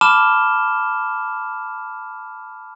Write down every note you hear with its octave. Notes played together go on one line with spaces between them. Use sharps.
A5 B5 D6 F6 E7 G7